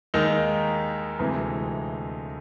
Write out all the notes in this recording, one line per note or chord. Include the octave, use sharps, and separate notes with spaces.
D#2 D#3 G#3 D#4
D2 C3 E3 G#3